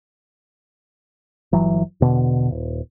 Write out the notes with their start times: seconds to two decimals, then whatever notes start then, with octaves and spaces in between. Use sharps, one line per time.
1.52 G1 E3 F#3
2.01 E1 B2 D3
2.51 D#1